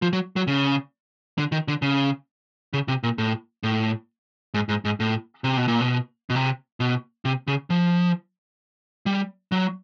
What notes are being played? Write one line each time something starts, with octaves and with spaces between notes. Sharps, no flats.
F3
F#3
F#3
C#3
D3
D#3
D3
C#3
C#3
C3
A#2
A2
A2
G#2
G#2
G#2
A2
C3
B2
A#2
B2
B2
C3
B2
C3
C#3
F3
G3
F#3